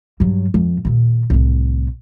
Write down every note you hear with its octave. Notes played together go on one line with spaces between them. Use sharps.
G2 F#3
F2
D#2 A#2
C2 A2